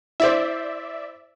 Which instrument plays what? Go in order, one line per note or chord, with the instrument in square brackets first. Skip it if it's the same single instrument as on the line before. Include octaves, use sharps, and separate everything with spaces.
[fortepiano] E4 C5 [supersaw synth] D5 E5